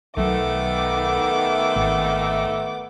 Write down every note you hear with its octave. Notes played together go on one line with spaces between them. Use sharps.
B1 D#3 F#3 A3 B3 D6
G#1